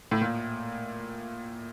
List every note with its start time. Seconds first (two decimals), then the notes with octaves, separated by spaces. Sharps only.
0.11 A2
0.21 A#2